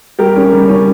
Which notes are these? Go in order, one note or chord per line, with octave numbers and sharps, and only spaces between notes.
G3 G4 A#4
C#4
G3
C#4